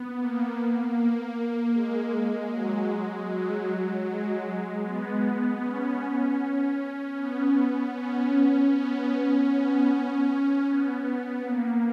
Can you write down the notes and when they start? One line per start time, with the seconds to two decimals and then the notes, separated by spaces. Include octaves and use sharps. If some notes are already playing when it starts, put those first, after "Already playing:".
Already playing: B3
0.18 A#3
0.96 A#3
1.74 G#3
2.50 F#3
2.89 G#3
3.28 F#3
4.06 G#3
4.84 B3
5.61 C#4
6.39 C#4
7.16 B3
7.94 C#4
8.72 B3
9.10 C#4
9.50 B3
9.89 C#4
10.65 B3
11.44 A#3